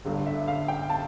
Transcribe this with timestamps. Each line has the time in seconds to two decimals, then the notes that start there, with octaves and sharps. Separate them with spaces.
0.05 G1 G2 D3 A3
0.26 E5
0.48 F5
0.68 G5
0.90 A5